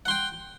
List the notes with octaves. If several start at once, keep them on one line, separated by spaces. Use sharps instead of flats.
F#5 G5 C6